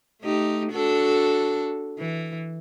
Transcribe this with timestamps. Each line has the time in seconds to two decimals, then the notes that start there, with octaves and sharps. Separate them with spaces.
0.23 A3 D#4 G4
0.72 D4 F#4 A4
1.99 E3